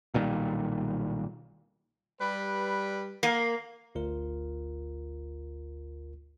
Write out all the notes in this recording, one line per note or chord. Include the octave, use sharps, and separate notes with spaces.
B1 A#2 D#3 G3
G3 B4
A#3
G1 D2 F4 A#4